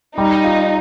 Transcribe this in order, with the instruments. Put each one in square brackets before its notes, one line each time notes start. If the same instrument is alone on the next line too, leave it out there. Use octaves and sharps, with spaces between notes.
[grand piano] G3 [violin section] D#4
[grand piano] F4